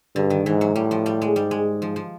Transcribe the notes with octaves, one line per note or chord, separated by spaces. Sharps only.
G2 D3
D#3
G#2 E3
F#3
A2 G3
F3
G3
G#3
G#2 G3
G#3
F3
F3